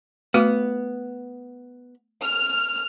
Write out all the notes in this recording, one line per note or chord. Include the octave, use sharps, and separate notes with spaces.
A3 B3 F#4
F6